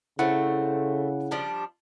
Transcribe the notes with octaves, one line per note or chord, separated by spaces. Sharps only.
C#3 A3 C4 E4 F#5
F3 G3 D4